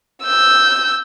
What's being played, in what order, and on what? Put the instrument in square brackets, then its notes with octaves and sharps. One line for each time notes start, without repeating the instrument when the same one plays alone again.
[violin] E6 G6